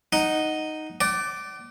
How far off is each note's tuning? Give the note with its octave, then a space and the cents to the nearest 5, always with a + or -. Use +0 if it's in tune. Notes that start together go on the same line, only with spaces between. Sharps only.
D#4 +0 F#5 +0
D5 +0 F#5 +40